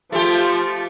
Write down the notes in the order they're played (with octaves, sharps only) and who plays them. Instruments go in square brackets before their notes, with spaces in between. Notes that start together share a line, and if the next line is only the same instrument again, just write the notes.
[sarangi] F3 [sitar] A3 G4 [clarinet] F4